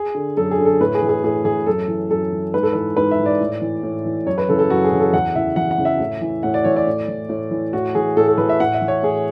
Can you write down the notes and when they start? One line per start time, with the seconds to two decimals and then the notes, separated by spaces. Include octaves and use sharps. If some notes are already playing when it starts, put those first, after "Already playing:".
Already playing: G#4
0.15 D3
0.37 F#2 A4
0.51 G#4
0.58 D3
0.65 A4
0.80 A2 B4
0.95 G#4
1.02 E3
1.09 G#4
1.24 A2 G#4
1.45 E3 G#4
1.66 F#2 A4
1.88 E3
2.10 F#2 A4
2.32 E3
2.54 G#2 B4
2.63 A4
2.73 E3 B4
2.97 G#2 B4
3.11 E5
3.19 E3
3.26 D5
3.41 A2
3.62 E3
3.83 A2
4.05 E3
4.26 F#2 C#5
4.38 B4
4.48 C#3 E3 A4
4.59 A4
4.70 F#2 F#4
4.84 G#4
4.92 C#3 E3
5.00 A4
5.14 E2 F#5
5.35 C#3 E3 E5
5.56 E2 F#5
5.71 F#5
5.78 C#3 E3
5.85 E5
6.00 A2
6.21 E3
6.43 A2 F#5
6.54 D5
6.64 E3 C#5
6.76 D5
6.87 A2
7.08 E3
7.29 A2
7.51 E3
7.73 A2 F#4
7.95 E3 G#4
8.17 A2 A4
8.27 A4
8.38 E3 B4
8.49 E5
8.60 A2 F#5
8.74 E5
8.82 E3
8.88 C#5
9.03 A2 G#4